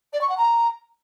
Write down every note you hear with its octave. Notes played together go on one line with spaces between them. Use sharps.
D5
C#6
F#5
A#5